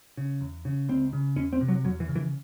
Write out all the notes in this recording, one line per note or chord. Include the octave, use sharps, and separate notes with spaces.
C#3
E2
C#3
C#2 C4
C#3
E2 C#4
C4
C3
F#3
E2 F#3
E3
C#3
E3